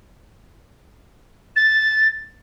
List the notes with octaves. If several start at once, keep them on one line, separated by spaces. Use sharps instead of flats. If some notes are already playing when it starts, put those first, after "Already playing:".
A6